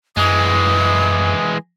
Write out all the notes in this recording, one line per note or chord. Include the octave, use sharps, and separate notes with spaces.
F#2 E3 G#3 D#6